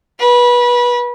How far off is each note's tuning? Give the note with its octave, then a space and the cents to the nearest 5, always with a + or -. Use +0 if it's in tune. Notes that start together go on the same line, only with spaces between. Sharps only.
B4 -25